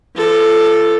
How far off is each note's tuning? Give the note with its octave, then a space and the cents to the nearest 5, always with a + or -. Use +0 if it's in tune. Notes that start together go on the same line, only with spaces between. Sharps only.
F3 -40 A4 +0